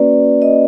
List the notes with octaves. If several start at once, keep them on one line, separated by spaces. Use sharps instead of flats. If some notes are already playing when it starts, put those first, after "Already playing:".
Already playing: A#3 C#4 F#4 B4 D5
D#5